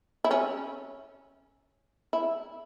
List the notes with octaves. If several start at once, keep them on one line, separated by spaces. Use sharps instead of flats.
E4
C#4
E4